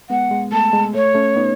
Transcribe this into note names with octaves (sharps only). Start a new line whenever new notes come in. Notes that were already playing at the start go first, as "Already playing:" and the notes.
G#3 B3 F#5
G#3
A3 A5
G#3
A3 C#5
A3 C#4
B3 D#4